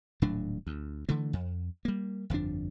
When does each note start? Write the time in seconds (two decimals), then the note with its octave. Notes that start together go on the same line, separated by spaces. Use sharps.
0.22 D#1 A2 F#3 D4
0.67 D2
1.09 D3 E3 A3
1.33 F2
1.85 G3 A#3
2.30 G1 F2 F3 D4